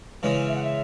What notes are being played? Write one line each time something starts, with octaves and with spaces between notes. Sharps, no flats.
C#3 E3 G#3 C#4
E5
F#5
E5